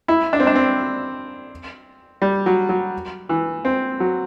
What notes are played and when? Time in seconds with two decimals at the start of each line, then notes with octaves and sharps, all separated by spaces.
0.08 E4
0.33 D4
0.40 C4
0.47 D4
0.55 C4
2.22 G3
2.46 F#3
2.69 F#3
3.29 E3
3.65 C4
4.00 F#3